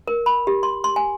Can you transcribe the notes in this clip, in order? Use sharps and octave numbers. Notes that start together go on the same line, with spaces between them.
A#4
B5
G4
C6
C6
G#5